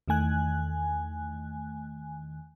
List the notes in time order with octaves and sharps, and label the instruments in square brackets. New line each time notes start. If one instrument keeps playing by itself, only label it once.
[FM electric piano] E2 D#3 A3 G#5 F#6